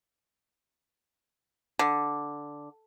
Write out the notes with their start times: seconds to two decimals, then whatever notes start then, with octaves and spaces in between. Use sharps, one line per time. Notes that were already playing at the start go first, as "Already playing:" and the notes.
1.79 D3